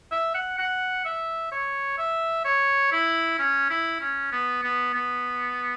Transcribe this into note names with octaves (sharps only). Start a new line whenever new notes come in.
E5
F#5
F#5
E5
C#5
E5
C#5
E4
C#4
E4
C#4
B3
B3
B3